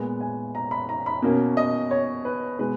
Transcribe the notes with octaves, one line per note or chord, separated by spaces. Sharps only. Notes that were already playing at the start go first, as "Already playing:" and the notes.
Already playing: A#2 G#3 B3
G#5
A#5
B5
A#5
B5
B2 A#3 C#4
D#5
C#5
B4
B2 G#3 B3 B4